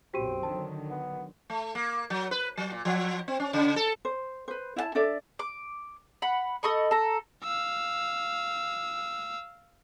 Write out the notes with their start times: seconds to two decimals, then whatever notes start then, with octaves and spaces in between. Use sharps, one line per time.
0.14 B1 F#2 C4 F#4 G4 D#7
0.43 D3 D#3 F#3 A5
0.91 B3
1.50 A3
1.75 A#3
2.10 F#3
2.31 B4
2.57 F#3
2.72 A#2
2.85 F3
3.28 C4
3.40 C#4
3.53 C#3
3.76 A4
4.05 C5
4.48 B4 C5
4.76 E4 E5 A5
4.95 D4 A4 D5 E5
5.39 D6
6.22 F#5 B5
6.63 A4 D#5 B5 C#6
6.91 A4 A#5
7.44 F5 E6